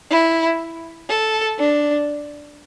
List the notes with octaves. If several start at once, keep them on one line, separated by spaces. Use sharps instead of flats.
E4
A4
D4